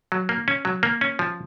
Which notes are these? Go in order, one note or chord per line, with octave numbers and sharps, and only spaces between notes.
F#3
A#3
C#4
F#3
A#3
C#4
F3